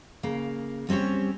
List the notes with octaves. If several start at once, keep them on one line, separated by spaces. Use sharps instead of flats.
C#3 A#3
G3 C4 C#4 G4 C#5